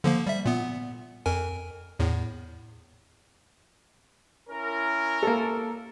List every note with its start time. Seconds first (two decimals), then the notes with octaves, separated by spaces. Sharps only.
0.04 D3 F3 A#3
0.27 G3 E5
0.45 A#2 B3
1.26 F2 A#4 G#5
1.99 E2 A2
4.50 C#4 E4 A#4
5.23 A#3 A4